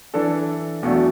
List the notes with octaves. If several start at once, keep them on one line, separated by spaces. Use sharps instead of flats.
E3 D4 A4
E2 B2 F#3 A3 D4